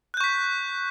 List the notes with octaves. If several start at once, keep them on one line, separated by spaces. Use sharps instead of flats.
C#6 F#6 G6 B6